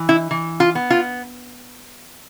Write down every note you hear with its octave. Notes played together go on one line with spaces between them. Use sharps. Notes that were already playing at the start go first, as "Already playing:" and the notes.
Already playing: E3
E4
E3
F4
B3
F4